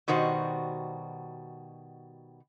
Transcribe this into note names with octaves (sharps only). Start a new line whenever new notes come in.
B2 D#3 G3 F#4 C5